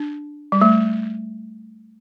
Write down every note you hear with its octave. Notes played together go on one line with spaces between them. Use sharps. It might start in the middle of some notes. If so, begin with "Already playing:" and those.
Already playing: D4
G3
A3